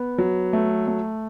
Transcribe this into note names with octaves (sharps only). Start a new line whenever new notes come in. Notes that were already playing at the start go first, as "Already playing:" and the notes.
Already playing: B3
F#3
A3
A3